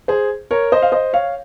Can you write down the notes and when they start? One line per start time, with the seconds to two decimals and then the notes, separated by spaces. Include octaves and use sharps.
0.08 G#4 C5
0.51 A#4 C#5
0.72 C5 D#5
0.82 F5
0.92 C5 D#5
1.13 C#5 F5